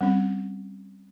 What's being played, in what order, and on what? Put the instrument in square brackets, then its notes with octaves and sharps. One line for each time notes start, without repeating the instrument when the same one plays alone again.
[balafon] G3 C4 C#4